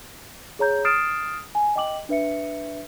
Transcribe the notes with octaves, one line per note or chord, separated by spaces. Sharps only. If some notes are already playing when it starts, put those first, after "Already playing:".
G#4 C#5 A#5 G6
D#6 F6 A6 C7 D7 E7
G#5
D#5 G5 D6 F#7
D4 B4 E5 C#7